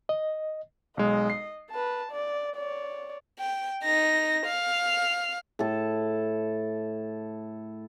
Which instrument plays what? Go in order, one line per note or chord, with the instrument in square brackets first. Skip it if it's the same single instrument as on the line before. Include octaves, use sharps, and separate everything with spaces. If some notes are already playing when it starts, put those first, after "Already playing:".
[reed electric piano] D#5
[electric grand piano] B1 G#3 [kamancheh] D#5
[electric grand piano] C7
[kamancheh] B4 A5
D5
C#5 D5
[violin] G5
D#4 A#6
F5
[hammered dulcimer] A2 A4